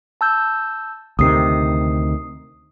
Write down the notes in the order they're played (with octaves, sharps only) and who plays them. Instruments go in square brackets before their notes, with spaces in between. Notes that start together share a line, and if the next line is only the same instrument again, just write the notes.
[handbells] A5 E6 G6
[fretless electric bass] D2 C3 D#3 [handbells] D#6 C7